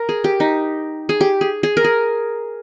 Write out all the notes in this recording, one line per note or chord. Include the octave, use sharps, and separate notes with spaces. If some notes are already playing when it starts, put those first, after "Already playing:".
Already playing: A#4
G#4
G4
D#4
G#4
G4
G#4
G#4
A#4
G#4